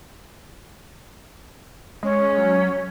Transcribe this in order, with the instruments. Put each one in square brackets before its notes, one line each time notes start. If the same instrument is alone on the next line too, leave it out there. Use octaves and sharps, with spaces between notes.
[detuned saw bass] G#3 [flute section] C#4
[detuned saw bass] F#3